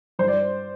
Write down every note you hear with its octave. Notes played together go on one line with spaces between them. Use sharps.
G2 C5
D5